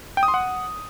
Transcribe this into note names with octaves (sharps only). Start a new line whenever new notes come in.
G5
D#6
C6
F#5